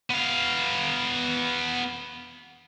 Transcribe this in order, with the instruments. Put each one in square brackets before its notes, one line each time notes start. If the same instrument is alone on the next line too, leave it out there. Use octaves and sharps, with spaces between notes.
[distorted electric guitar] B3 F5